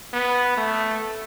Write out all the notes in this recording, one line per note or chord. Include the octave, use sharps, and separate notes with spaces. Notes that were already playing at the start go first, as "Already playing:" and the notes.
B3
A3